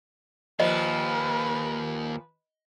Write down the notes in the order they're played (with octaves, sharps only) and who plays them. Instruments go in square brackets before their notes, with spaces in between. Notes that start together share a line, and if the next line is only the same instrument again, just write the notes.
[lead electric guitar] D#2 [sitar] A#2 F3 [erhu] B4 [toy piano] D#5